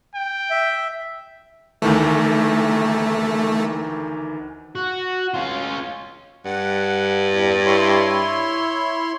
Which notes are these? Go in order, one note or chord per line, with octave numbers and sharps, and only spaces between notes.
G5
E5
D2 D#3 E3 A3
F#4
C#4 F4
G2 F#5
E2
E4 C#5 C6